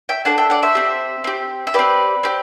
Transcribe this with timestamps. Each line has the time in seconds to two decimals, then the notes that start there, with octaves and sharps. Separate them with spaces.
0.09 E5 G5
0.25 D4 A4 F#5 A5
0.38 E5 G5
0.50 D5 F#5
0.62 C5 E5
0.75 C4 G4
1.24 C4 G4
1.67 E5
1.74 C4 G4 B4 D5
2.23 C4 G4